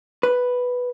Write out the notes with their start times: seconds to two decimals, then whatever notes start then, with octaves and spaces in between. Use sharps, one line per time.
0.23 B4